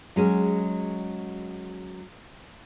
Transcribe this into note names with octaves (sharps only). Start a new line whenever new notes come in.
F#3 G#3 C#4